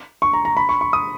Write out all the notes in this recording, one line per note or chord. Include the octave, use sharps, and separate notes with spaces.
C#6
A#5
A#5
B5
C#6
C#6
D#6